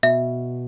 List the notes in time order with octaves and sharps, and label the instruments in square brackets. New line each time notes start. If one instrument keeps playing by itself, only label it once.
[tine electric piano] B2 [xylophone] E5